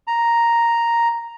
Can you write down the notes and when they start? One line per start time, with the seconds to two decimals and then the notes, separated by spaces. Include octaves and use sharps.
0.07 A#5